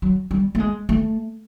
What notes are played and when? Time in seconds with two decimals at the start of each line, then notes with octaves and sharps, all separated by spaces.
0.02 F#3
0.31 G3
0.55 A3
0.60 G#3
0.89 A3